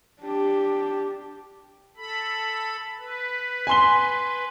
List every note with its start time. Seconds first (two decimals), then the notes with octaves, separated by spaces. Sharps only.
0.22 D4 G4
1.97 A4 B5
2.99 B4
3.67 G#5 C6 G7